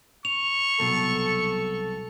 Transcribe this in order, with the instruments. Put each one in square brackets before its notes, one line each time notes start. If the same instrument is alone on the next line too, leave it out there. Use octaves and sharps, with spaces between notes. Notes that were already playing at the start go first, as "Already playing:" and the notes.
[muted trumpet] C#6 [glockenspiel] F7
[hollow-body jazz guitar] C2 B2 F#3 [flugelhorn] A4